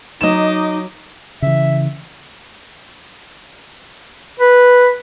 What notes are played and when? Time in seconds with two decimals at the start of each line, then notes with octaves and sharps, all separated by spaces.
0.21 F#3 D#4 D#5 D6 E7
1.42 C#3 E3 E5
4.40 B4